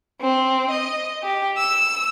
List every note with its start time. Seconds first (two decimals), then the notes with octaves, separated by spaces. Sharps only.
0.21 C4
0.70 D#5
1.23 G4
1.57 E6